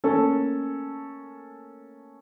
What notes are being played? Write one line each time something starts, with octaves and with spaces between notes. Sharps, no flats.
A3 A#3 C#4 A4